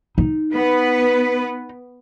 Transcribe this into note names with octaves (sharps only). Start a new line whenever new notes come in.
D#4
B3 B4